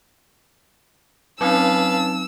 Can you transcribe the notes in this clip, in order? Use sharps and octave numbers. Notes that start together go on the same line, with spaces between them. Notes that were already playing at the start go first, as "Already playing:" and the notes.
F#3 C4 C#4 D#4 B4 F5 A5 E6